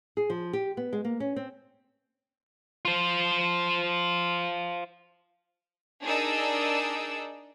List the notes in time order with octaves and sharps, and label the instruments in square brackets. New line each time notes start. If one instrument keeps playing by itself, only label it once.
[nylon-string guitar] G#4
F3
G4
B3
G#3
A#3
C#4
C4
[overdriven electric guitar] F4 C5
[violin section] D4 D#4 G#4 A#4 D5 E6